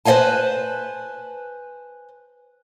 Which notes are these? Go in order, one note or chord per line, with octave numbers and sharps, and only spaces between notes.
B4 C5 D#5 F5 G#5 A5